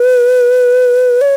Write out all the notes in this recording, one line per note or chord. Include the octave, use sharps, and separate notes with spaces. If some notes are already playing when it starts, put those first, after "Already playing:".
Already playing: B4
C#5